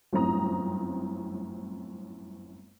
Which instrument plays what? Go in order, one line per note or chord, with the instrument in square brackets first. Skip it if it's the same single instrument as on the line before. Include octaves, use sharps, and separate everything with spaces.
[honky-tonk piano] G1 F#2 A2 C4 A#5 D#6